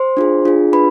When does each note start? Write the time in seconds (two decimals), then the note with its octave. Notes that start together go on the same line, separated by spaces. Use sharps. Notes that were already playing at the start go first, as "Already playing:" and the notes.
Already playing: C5 C6
0.17 D4 F4 G#4
0.45 D4 F4 G#4
0.73 D4 F4 B4 B5